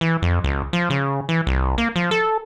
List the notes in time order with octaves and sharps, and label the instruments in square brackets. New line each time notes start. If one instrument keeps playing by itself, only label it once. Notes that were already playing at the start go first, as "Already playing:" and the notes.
[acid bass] E3
F2
C#2
F3
C#3
E3
C2
A#3
F3
A4